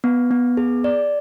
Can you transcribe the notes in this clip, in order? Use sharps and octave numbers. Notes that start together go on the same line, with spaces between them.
B3
B3
G#4
D5